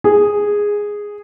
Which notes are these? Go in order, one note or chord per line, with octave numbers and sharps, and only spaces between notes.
G#4